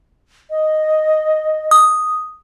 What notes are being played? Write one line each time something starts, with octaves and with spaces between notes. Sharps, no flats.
D#5
D#6